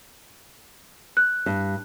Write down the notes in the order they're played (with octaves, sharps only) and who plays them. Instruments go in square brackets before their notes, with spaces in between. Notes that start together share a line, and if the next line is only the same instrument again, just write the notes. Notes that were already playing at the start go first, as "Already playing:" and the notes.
[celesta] F#6
[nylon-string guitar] G2